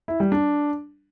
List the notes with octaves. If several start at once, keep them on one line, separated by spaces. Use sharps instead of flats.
E4
G3
D4